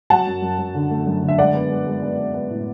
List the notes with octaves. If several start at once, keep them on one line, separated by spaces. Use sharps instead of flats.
F#3 F#5 A5
F#2
F#2
F#3
D3
A3
F#2
D3
E5
G#3 D5 F#5
B3
G#3
G#3
B3
B3
B3
A2